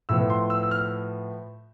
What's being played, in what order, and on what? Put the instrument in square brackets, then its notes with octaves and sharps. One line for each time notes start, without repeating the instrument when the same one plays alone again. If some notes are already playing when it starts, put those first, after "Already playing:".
[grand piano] A2 F3 B3 E6
C6
E6
E6
F6